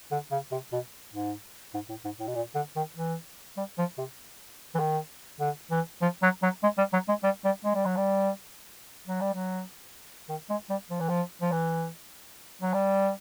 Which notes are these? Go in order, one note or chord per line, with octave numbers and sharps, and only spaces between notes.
D3
C#3
C3
B2
G#2
G#2
A2
G#2
A2
B2
A#2
D3
D#3
E3
G3
F3
C3
E3
D#3
D3
E3
F3
F#3
F#3
G#3
G3
F#3
G#3
G3
G3
G#3
G3
F#3
G3
F#3
G3
F#3
D#3
G#3
G3
F3
E3
F3
F3
E3
F#3
G3